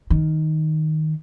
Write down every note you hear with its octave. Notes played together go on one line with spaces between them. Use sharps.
D#3